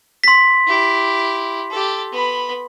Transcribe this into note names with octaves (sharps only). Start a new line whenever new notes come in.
C6 B6
E4 G4
G4 A4
B3 B5